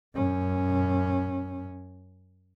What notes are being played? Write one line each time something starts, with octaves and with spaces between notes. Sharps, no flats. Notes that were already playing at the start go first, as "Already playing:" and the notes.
F#2 C#4